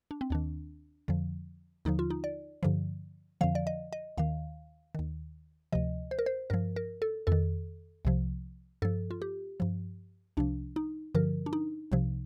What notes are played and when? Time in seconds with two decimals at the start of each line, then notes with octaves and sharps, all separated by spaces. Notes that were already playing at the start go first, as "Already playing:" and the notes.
0.11 D4
0.21 C4
0.30 D#2 D#3 D4
1.08 F2 D3 F3
1.85 D#2 D3 F3 D#4
1.99 F4
2.10 D#4
2.24 D5
2.63 G2 D3 F3
3.41 F2 D3 F3 F5
3.55 D5
3.67 D#5
3.93 D#5
4.18 D#2 D#3 F5
4.95 D#2 D#3
5.72 D2 C3 F3 D#5
6.11 C5
6.19 A#4
6.26 C5
6.50 G2 F3 A#4
6.76 A#4
7.02 A4
7.27 F2 D#3 A4
8.05 C2 C3 F3
8.82 G2 F3 A4
9.11 F4
9.22 G4
9.60 G2 F3
10.37 C2 C3 F3 D4
10.76 D#4
11.15 G2 D3 F3 A#4
11.46 D4
11.53 D#4
11.92 C2 C3 F3